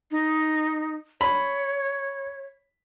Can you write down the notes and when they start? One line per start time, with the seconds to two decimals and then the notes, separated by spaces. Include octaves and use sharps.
0.11 D#4
1.21 C#5 B5